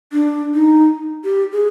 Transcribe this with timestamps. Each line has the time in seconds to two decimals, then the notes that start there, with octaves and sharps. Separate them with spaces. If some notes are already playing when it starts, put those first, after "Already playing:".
0.12 D4
0.54 D#4
1.24 G4
1.52 G#4